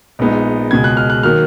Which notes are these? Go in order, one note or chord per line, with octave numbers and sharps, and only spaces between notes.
A#1 A#2 G#3 B3 D#4
C#2 B2 G#3 G#6
F#6
F6
F#6
D#3 F#3 A#3 F6